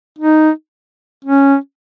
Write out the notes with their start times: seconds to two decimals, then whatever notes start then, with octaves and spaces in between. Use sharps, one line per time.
0.18 D#4
1.24 C#4